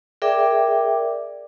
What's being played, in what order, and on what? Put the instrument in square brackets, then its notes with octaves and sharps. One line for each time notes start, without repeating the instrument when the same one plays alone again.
[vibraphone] G#4 A#4 D5 E5 G5 D6